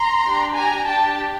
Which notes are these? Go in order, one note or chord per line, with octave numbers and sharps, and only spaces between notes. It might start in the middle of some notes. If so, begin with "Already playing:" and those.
Already playing: A#5 C6
D4 G4
G#5 A#5
D4 G4 G5 A5